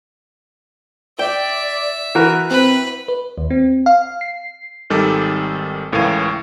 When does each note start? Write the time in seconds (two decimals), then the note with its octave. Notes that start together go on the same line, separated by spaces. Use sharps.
1.19 D5 E5 G5
2.15 E3 F#4 A#4 F#6
2.51 C4 B4
3.08 B4
3.38 D#2
3.50 C4
3.86 F5
4.21 C7
4.90 G#1 D#3 G3 A4 D6
5.92 C#2 A2 E3 A#4 F5 D#7